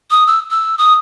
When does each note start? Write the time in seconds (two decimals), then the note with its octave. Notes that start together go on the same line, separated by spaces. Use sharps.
0.11 D#6
0.27 E6
0.51 E6
0.78 D#6